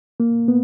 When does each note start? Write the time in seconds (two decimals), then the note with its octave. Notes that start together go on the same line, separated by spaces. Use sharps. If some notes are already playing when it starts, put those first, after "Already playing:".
0.20 A#3
0.48 B3